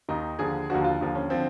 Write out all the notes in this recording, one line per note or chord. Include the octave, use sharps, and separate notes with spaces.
D#2 D#3 D#4
D#2 D3 F3 G#4
D#2 D3 F3 F#4
F4
D#2 D3 F3
C#4
D3 F3 C4